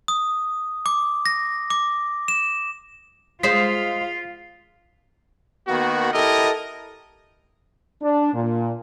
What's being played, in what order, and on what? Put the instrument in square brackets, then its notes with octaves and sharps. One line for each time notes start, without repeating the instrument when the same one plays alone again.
[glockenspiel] D#6
D6
A#6
D6
E7
[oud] G#3 C5 [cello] F4 F5 [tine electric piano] B6 C7
[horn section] D#3 A#3 B3 F#4
E4 G4 A4 A#4 D#5
[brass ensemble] D4
A#2